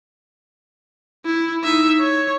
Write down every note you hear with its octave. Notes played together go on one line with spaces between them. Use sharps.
E4
D#4 E5
C#5